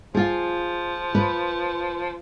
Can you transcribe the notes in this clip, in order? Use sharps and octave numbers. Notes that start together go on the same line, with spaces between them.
F3 F4 G#4
B4